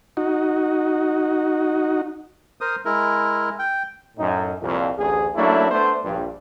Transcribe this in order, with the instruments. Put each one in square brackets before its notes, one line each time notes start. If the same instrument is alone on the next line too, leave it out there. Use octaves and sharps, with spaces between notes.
[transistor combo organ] D#4 F#4
[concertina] A#4 C5 D#6
G#3 E4 A#4
G5
[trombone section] F#2 A2 D#4
C2 F2 A#2
A1 D2 G#4
F#3 A3 A#3 C#4 D4 E4
A3 B3 D4 C5
A#1 G2